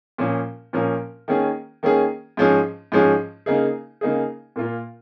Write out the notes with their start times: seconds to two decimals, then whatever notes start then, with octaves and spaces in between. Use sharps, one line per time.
0.18 A#2 F3 C#4 A#4
0.73 A#2 F3 C#4 A#4
1.28 D#3 A#3 C#4 G#4
1.83 D#3 A#3 C#4 G#4
2.37 G#2 F3 C#4 G#4
2.92 G#2 F3 C#4 G#4
3.46 C#3 A#3 D#4 G#4
4.01 C#3 A#3 D#4 G#4
4.56 A#2 A#3 F4 A#4